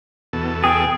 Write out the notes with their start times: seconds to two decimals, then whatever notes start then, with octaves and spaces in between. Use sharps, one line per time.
0.33 E2 B2 A4
0.64 G#4 G5